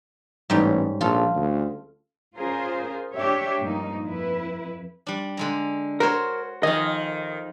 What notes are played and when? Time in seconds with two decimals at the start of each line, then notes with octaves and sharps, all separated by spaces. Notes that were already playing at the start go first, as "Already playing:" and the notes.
0.50 A1 G#2 G3 C#4
1.01 A#1 F4 A4
1.35 D2
2.36 C#4 F4 G#4 A#4 C5
3.13 D4 G4 C#5 E5
3.60 G2 A#2 F3 A#3 D#4
4.06 F2 E4 B4
5.07 G3 D4
5.37 D3 G#3 A#5
6.00 F#4 A#4 C5 C#5
6.63 F2 D#3 D#5 G#5